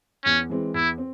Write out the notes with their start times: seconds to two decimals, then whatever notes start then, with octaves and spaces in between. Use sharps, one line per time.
0.25 E2 C#4
0.49 E3 G#3 C4
0.74 E2 E4
0.98 C4